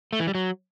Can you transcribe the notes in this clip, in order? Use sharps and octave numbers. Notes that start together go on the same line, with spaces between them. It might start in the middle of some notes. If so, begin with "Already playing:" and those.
A3
E3
G3
F#3